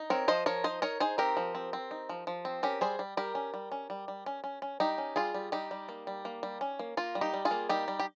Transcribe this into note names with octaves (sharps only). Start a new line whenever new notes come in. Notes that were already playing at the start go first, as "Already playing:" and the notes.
Already playing: D#4
C4 A#4 C#5
F3 C5 D#5
F3 A#4 C#5
D#4 C5 D#5
D#4 A#4 C#5
D#4 G#4 C5
C4 G4 A#4
F3
C4
C4
D#4
F3
F3
C4
C#4 G4 A#4
G3 G#4 C5
G3
G3 G4 A#4
C#4
G3
C#4
G3
G3
C#4
C#4
C#4
G3 D#4 G4
C#4
G3 F4 G#4
G3
G3 D#4 G4
G3
A#3
G3
A#3
G3
C#4
A#3
A#3 F4
G3
D#4 G4
G3
F4 G#4
A#3
G3 D#4 G4
G3
G4